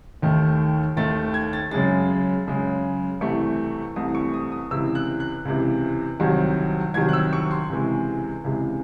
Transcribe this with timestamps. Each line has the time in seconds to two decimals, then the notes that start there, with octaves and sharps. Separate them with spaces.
0.22 D#2 D#3 A3
0.97 D#2 D#3 A3 A6
1.34 G#6
1.53 A6
1.71 F#2 C#3 G#3 A6
2.47 F#2 C#3 G#3
3.21 C2 C3 E3 A3 C#6
3.96 C2 C3 E3 A3 D#6
4.15 C#6
4.34 D#6
4.52 D#6
4.71 C#2 C3 E3 E6
4.95 F#6
5.20 F#6
5.45 C#2 C3 E3
6.20 C2 C3 D#3 F#3
6.94 C2 C3 D#3 F#3 G#6
7.09 F#6
7.13 E6
7.33 C#6
7.51 C6
7.69 C#2 C3 E3 G#3
8.44 C#2 C3 E3 G#3